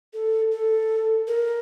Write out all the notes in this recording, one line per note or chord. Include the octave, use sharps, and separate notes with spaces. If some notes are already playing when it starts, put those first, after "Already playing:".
A4
A4
A#4